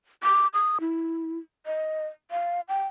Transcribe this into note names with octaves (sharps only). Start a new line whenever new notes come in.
D6
D#6
E4
D#5
F5
G5